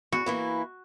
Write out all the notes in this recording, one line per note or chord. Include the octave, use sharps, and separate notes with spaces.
E2 F#4
E3 A#3 E4